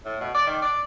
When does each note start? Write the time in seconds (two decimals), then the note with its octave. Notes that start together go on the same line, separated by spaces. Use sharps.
0.05 A2
0.20 B2
0.34 D5
0.47 D#3
0.62 D5